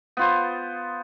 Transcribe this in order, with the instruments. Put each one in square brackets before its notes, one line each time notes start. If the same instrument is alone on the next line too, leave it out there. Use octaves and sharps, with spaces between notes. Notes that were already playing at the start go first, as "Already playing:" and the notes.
[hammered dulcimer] B3 F4 C5